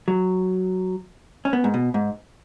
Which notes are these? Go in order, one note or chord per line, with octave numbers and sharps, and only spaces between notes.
F#3
C#4
B3
G#2
B2
G#2